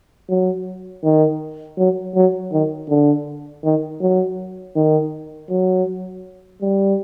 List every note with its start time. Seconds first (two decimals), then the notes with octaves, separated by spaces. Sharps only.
0.29 F#3
1.03 D#3
1.78 F#3
2.15 F#3
2.52 D#3
2.89 D3
3.64 D#3
4.01 F#3
4.76 D#3
5.50 F#3
6.62 G3